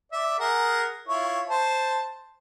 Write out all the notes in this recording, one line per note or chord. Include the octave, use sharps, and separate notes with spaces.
D5 E5
G#4 A#4 F#5
E4 F4 C#5
C5 A5